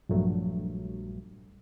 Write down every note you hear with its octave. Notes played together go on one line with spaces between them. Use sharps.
A#1 G2 F#3 A3